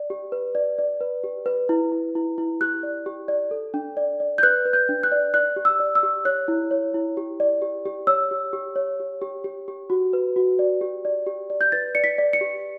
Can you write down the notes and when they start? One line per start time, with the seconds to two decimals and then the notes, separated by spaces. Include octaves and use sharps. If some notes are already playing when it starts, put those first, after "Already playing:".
Already playing: D5
0.10 G4
0.32 B4
0.55 D5
0.78 D5
1.01 B4
1.24 G4
1.46 B4
1.69 E4
1.92 E4
2.15 E4
2.38 E4
2.61 G4 F#6
2.83 D5
3.06 G4
3.28 D5
3.51 A4
3.74 D4
3.97 D5
4.20 D5
4.38 G6
4.43 B4 F#6
4.66 B4
4.73 G6
4.89 D4
5.03 F#6
5.12 D5
5.34 D5 F#6
5.56 G4
5.65 E6
5.80 D5
5.95 E6
6.03 G4
6.25 C#5 F#6
6.48 E4
6.71 C#5
6.94 E4
7.17 G4
7.40 D5
7.62 G4
7.86 G4
8.07 C#5 E6
8.31 G4
8.53 G4
8.76 C#5
9.00 G4
9.22 G4
9.44 G4
9.68 G4
9.90 F#4
10.13 B4
10.36 F#4
10.59 D5
10.81 G4
11.05 D5
11.26 G4
11.50 D5
11.61 G6
11.72 B4 A6
11.95 D5 C#7
12.04 B6
12.18 D5
12.33 C#7
12.41 G4